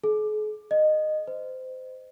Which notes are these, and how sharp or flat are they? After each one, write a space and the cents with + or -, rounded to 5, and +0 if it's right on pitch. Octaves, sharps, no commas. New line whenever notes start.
G#4 +45
D#5 -15
C5 -25